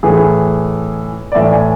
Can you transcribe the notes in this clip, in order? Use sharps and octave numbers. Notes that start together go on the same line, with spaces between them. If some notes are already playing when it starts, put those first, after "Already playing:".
A2 E3 G#4
D5
A2 E3 E5
G#5